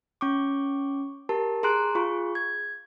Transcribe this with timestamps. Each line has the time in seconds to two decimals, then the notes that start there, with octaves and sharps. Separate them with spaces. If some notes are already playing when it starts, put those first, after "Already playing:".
0.21 C#4 C#6 D6
1.29 G4 A#4 A5
1.63 G#4 A#5 C6 F#6 D7
1.95 F4 G#4 C#6
2.35 G#6